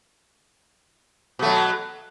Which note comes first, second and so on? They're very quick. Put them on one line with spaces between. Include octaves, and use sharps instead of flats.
B2 A3 F#3